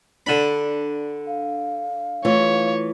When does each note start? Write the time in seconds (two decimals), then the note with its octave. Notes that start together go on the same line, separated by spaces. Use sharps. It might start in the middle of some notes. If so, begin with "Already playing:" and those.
0.26 D3 D4 B5
1.27 F5
2.25 E3 A3 F4 C#5